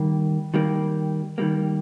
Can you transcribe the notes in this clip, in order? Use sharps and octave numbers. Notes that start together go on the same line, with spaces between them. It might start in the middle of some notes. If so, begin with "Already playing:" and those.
Already playing: D#3 G3 A#3
D#3 G3 A#3
D#3 G3 A#3